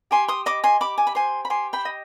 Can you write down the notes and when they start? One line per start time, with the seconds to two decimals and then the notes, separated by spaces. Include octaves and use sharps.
0.11 G4 G#5 C6
0.28 C6 D#6
0.46 D#5 B5 D6
0.64 G#5 C6
0.80 G4 B5 D6
0.98 G#5
1.07 B5
1.15 C5 G#5 C6
1.45 B5
1.50 G4 G#5 C6
1.73 G5 B5
1.85 D#5